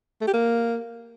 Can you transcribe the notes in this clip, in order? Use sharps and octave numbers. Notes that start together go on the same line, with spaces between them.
A3
G4
A#3